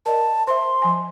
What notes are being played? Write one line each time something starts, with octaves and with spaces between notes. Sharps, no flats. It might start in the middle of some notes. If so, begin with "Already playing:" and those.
A#4 D5 D#5 A5
C5 E5 C6
F3 G#5